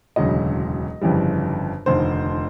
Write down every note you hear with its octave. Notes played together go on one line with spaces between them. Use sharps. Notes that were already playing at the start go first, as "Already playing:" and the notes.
E1 D2 C#3 F#3 D#5
G1 F2 C#3 E3 G3
F1 D#2 D3 C5